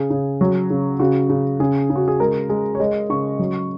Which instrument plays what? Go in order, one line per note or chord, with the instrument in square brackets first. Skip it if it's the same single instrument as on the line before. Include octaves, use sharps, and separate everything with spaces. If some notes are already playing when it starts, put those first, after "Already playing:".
Already playing: [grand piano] C#3 G#4
C#3
F#3
C#3
C#3 F#4
C#3
C#3 G#4
C#3
F#4
G#4
G#3 A#4
G#3
C#5
G#3 D#5
C#3 C#6
F#3